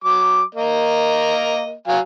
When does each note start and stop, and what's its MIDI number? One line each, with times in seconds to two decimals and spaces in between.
0.04 0.42 54
0.04 0.42 86
0.55 1.73 58
0.55 1.73 70
0.55 1.73 75
1.87 1.99 54
1.87 1.99 77
1.87 1.99 80